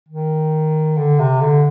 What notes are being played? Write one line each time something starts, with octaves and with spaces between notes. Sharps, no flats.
D#3
D3
C3
D3